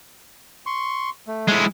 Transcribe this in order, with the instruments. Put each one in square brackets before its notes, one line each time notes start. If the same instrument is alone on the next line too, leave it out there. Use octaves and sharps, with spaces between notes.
[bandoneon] C6 C#6
A3
[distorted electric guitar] G#3 E4